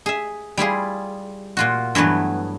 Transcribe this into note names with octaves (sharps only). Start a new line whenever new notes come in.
G#4 E5
G3 E4 F4 G#4
A#2 F4 F#4
G2 E3 F#3 A3 B3